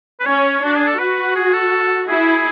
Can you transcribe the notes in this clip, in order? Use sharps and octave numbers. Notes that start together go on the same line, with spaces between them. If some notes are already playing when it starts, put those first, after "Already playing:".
B4
C#4 C#5
D4 F#4
G#4
A4
F#4 B4
G#4
A4
E4 G#4